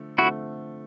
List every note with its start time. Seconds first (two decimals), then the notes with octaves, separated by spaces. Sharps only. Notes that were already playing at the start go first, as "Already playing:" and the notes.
Already playing: D3 F3 A3
0.18 D3 F3 A3 C4 E4 F#4